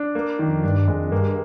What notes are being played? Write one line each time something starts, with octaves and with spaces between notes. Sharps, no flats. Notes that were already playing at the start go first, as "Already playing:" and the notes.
Already playing: D4
A#3
D#3
F2
G2 D4
F2 G#3
G2 A#3